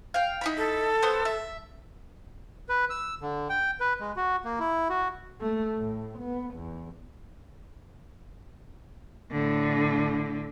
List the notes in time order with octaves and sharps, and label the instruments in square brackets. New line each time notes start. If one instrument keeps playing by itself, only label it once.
[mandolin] F5 G5
D#4 E4 B5
[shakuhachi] A4
[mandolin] B3 C5
E5
[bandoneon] B4
E6
D3
G5
B4
G#3
F#4
A#3
E4
F#4
[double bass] A3
A2
B3
E2
[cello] A2 D3